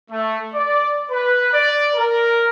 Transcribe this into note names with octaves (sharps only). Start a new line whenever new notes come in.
A3
D5
B4
D5
A#4